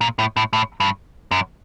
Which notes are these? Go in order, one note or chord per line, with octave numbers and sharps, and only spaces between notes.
A#2
A2
A2
A2
G2
F#2